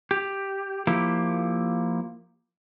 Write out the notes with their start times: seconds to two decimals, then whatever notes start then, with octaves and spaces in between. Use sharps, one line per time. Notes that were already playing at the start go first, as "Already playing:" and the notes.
0.11 G4
0.87 F3 A#3 E4 G4